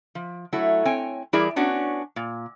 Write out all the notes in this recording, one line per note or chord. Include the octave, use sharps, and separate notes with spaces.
F3
F#3 A3 E4
C4 C#5 G5 G#5
E3 G3 E4 G#4 A#4 D5
B3 C#4 D4 F#4
A#2